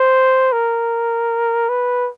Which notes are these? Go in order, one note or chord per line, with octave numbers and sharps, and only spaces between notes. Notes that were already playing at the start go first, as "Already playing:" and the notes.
Already playing: C5
A#4
B4